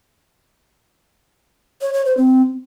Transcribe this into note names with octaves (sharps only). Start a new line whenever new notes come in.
C#5
C#5
C5
C4